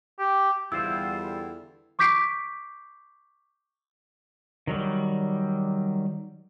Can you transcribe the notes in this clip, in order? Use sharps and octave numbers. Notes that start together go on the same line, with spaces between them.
G4
E2 D3 G3 E4 F4 C5 E6
C#6 D6 G6 B6 C7 D7
D#3 F#3 G3